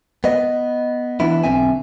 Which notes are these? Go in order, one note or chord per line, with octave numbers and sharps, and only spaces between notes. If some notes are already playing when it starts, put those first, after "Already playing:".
B3 D#5
E3 B3 D4 E4
B1 D3 C4 E5 G#5